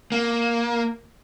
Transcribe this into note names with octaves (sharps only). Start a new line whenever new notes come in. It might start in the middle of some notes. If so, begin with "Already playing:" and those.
A#3